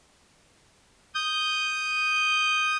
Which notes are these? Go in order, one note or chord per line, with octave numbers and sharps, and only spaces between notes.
D#6 G6